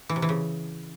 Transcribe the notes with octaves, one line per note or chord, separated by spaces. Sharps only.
E3
C3
E3
C#3